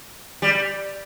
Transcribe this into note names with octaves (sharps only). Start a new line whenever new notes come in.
G3